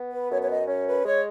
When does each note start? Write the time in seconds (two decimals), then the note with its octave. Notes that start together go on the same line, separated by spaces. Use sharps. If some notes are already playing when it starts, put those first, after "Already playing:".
Already playing: B3
0.12 B4
0.31 F#2 C#5
0.41 C#5
0.50 D#5
0.68 C#4 C#5
0.87 B4
1.05 G#3 C#5